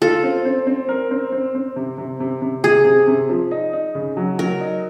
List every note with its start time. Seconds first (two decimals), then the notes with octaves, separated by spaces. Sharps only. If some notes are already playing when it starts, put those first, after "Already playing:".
0.02 F4 A4
0.24 C4
0.45 C4
0.67 C4
0.89 A#4
1.11 C4
1.32 C4
1.55 C4
1.76 C3
1.98 C3
2.20 C3
2.42 C3
2.64 C3 G#4
2.86 C3
3.08 C3
3.29 F3
3.51 D#4
3.73 D#4
3.95 C#3
4.17 F#3
4.39 F#3 A#4
4.61 D#4